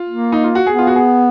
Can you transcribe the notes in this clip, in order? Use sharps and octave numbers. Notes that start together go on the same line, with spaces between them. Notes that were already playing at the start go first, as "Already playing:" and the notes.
Already playing: F4
A#3
D#4
F4
F#4
B3 G#4
F4
F#4
G#4